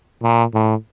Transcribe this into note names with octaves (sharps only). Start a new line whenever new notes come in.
A#2
A2